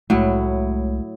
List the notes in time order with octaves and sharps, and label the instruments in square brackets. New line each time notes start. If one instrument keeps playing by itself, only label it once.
[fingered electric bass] C2 G#3 A3 [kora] A2 F#3 E4